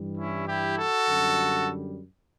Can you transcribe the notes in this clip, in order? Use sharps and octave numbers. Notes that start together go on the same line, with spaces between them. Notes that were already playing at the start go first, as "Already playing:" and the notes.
Already playing: G2 E3 G3
C#4 E4
E4 G4
F#4 A4
F#2 D3 G3